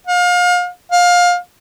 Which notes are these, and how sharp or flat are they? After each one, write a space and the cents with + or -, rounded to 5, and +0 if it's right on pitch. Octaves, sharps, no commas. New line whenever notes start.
F5 +35
F5 +20